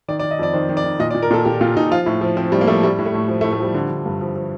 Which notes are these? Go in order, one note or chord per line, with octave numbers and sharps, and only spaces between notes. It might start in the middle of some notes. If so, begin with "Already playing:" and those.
D#3 D5
D5
D#3
D#5
F2 D5
D#3 C5
D#3
D5
D#3
A#2 D#5
D5
A#2
A#4
A#2 A4
A#2 G4
A#2 F4
A#2 D#4
F3 F4
A2
F3
F3 C4
A2 G3
A#3
F3 A3
A2 G3
A2
A3
A2
F3
A3
A2
A3
F3 G3
D3
D3
G2
F3
F3